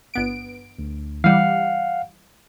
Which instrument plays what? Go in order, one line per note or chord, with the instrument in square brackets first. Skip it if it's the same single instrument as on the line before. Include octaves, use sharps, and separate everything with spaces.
[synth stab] G1 B3 D7
[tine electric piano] D2
[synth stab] E3 G3 [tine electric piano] F5 F#5